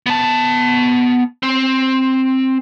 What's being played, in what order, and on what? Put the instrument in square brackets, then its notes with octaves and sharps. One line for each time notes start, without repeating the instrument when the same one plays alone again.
[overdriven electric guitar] B3 A5
C4